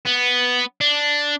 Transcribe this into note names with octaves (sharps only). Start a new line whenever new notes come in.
B3
D4